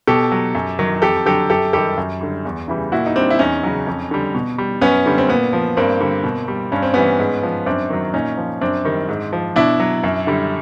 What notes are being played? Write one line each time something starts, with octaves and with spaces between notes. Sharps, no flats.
B2 G4 A4
F#3
F#2
D#3 F#3
F2 G4 A4
D3 F#3 G4 A4
F#2 G4 A4
D#3 G3 G4 A4
F#2
D3 G3
E2
C#3 E3 G3
A#2 E4 F#4
D#4
G3 C4 D4
E4
E2 C#4 D#4
C#3 F#3
F2
D3 G3
B2
G3
F#2 B3 C#4
D3 G3
C4
A#2 B3
F3
G2 A#3 C4
D3 G3
B2
G3
G2 C#4
C4
E3 G3 B3 C#4
G#2
F3
F#2 C4 D4
D#3 F#3
A#2 C#4 D#4
F3
F#2 C4 D4
D#3 G3
G#2
F3
B2 D4 E4
F#3
F#2
D3 G3